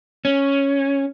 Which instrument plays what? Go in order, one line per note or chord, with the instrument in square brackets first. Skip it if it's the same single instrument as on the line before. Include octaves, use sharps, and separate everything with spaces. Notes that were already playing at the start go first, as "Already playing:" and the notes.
[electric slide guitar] C#4